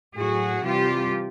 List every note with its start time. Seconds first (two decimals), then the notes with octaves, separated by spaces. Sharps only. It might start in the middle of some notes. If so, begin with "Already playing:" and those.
0.16 A2 F#3 F#4 G#4
0.63 C3 E3 G3 F4 G4